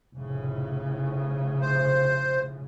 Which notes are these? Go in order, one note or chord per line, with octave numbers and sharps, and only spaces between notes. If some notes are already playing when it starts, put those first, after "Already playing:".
F1 A2 C#3
C5